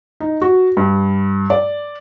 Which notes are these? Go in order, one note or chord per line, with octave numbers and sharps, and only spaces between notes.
D#4
F#4
G2
D5